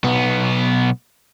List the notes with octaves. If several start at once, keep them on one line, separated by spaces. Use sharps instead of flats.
B1 B3